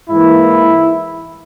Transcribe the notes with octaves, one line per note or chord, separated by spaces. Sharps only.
G#2 E3 A#3 E4